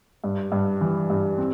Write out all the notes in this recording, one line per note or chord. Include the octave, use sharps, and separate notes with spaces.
G2
G2
E3
G2
C4